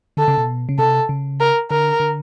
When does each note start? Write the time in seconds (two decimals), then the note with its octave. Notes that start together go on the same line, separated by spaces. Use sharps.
0.17 D3 A4
0.28 C#3
0.38 B2
0.69 C#3
0.78 C3 A4
1.09 C#3
1.40 A#4
1.70 D3 A#4
2.00 D3